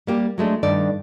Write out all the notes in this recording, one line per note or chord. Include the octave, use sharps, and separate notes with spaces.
G3 A#3 G4
F#3 G#3 A3 D4
G2 D#3 A4 D5